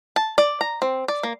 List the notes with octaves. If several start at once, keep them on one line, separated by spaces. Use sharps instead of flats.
A5
D5
A#5
C4
D5
A#3